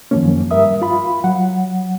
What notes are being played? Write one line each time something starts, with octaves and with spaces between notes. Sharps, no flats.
F#2 D#3 F3 F#3 A#3 C#4
G2 G3 A#4 E5 D#6
F4 F5 B5
F#3 F#5